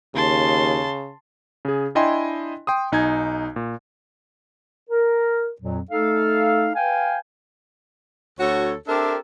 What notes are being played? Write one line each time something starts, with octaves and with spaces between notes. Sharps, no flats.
D#2 C#3 A5 C6
C#3 G#4
D4 E4 D#5 G5 G#5 C6
G5 C6 D#6
B1 D#4 G#5 G#6
A#2
A#4
F2 A#2 F#3
A3 D#4 A4 F5
B4 F5 G5 G#5
D2 F#4 A4 C#5
C4 D4 G4 A4 A#4 E5